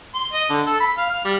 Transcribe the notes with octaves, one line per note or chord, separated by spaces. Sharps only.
C6
D#5
D3
A4
B5
F5
F5
G3